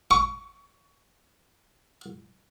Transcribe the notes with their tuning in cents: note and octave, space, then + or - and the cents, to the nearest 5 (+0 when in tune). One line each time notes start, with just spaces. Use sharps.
C#6 +25